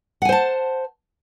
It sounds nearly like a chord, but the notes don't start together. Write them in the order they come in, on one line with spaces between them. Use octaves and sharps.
F#5 G#5 C5 A5